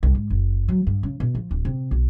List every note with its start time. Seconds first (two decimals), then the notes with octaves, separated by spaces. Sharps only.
0.03 C2
0.15 G#2
0.30 F#1
0.68 F#3
0.87 G2
1.03 C#3
1.20 B2
1.35 F3
1.51 D1
1.65 C3
1.91 B1